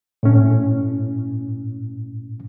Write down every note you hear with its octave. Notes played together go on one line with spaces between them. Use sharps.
A2 C#4